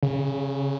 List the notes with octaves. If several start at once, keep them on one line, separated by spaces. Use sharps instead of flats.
C#3